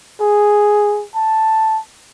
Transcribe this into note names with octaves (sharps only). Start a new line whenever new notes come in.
G#4
A5